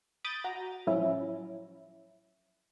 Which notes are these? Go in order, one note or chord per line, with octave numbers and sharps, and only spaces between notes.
B5 D6 D#6 G6 A6
F#4 A#5
A2 F3 F#3 C#4 E4